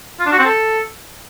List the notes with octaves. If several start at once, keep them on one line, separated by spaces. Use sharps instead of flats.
F4
D4
F#4
C4
A4